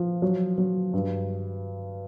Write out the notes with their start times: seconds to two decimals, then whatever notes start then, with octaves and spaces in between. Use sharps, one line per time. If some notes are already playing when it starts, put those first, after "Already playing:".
Already playing: F3
0.22 F#3
0.58 F#3
0.93 G2